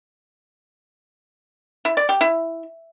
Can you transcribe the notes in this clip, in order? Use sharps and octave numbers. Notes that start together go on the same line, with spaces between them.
E4
D5
G4
E4